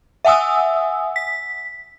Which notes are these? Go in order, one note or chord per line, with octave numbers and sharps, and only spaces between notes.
E5 F#5 G#5 D#6 E6
B6